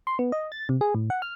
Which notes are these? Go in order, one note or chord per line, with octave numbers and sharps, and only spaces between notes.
C6
B3
D#5
A6
C3
G#4
A2
F#5
F6